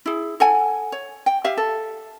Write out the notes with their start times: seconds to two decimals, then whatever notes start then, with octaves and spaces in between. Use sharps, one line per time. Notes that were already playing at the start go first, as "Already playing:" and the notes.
0.06 E4 G#4
0.40 A4 F#5 G#5
0.92 C#5
1.26 G5
1.44 G4 E5 F5
1.57 A4